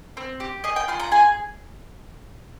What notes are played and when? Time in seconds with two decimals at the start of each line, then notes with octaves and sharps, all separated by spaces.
0.17 C4
0.40 G4
0.64 G#4 D#5
0.76 G5
0.88 F4 C6
1.00 A#5
1.12 G#4 G#5